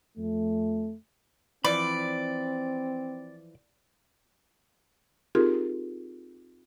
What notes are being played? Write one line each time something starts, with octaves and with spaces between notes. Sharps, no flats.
F2 A3
E3 F3 C4 D5 B5 D6
C4 D#4 F4 G4 G#4 A#4